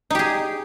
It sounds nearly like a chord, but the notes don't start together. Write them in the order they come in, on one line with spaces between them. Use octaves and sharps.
D#4 G4 G#4